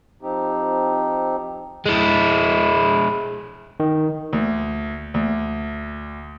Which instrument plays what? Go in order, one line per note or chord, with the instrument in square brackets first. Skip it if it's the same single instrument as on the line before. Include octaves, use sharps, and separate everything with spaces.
[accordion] F3 C4 D#4 G4
[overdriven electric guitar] G#3 E4
[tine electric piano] D#3
[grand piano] D2
D2